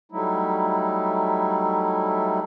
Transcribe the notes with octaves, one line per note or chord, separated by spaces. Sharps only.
F#3 G3 A3 D#4 E4